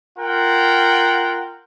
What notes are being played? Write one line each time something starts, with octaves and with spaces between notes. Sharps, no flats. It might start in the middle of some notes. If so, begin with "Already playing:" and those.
F4 A#4 F#5 G5